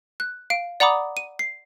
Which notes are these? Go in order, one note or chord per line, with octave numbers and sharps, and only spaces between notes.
F#6
F5 D7
D5 F#5 A#5 B5 D6 D#6
D#7
C7